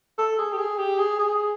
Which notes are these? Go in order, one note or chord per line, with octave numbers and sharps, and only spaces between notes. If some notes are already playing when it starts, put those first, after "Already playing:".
A4
G#4
G4
G#4
G4
G#4
G#4